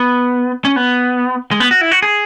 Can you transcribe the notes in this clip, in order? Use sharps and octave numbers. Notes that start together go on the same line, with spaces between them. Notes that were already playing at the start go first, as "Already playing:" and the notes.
Already playing: B3
C#4
B3
G#3
B3
F#4
E4
F#4
G#4